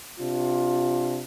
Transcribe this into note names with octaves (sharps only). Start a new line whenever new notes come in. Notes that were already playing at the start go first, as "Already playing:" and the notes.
C3 D4 F4